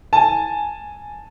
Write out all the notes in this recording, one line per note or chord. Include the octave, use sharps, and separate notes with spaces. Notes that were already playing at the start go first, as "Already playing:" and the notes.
G#5 A5